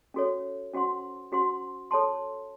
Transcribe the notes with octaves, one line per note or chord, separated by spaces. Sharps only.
C#4 F#4 A4 C#5
C#4 F#4 C5 F#5 C6
C#4 F#4 C5 F#5 C6
A4 C#5 A5 C6